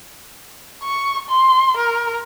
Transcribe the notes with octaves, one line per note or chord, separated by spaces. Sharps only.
C#6
C6
A#4